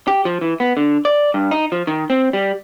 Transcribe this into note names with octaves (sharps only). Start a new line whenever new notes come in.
G4
F3
E3
B3
D3
D5
G2
D#4
F3
D#3
C4
G3